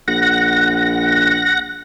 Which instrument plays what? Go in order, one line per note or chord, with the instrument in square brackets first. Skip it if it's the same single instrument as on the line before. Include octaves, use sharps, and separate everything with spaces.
[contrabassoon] A#1 [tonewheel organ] F#5 A#6